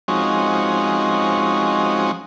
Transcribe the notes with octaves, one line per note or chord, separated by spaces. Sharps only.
F3 G#3 C4 C#4 D#4 F#4